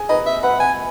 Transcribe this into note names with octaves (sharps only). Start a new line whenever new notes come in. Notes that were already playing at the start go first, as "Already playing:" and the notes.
Already playing: G#4 G#5
B4 D#5 B5
E5
B4 F#5 B5
G#5